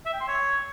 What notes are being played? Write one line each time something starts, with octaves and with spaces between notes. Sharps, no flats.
E5
G5
C6
C#5